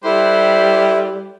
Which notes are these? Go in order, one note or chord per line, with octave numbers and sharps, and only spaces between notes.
G3 E4 G4 A4 B4 C5